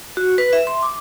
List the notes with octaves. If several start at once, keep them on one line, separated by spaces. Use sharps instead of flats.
F#4
B4
E5
C6
D6